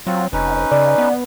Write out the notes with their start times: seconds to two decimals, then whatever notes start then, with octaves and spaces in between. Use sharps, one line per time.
0.07 F#3 C4 F4
0.33 F1 C#4 D#4 B4
0.72 C#3 D5
0.98 B3